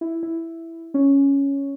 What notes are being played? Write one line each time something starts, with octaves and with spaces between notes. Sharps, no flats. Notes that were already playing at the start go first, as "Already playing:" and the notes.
E4
E4
C#4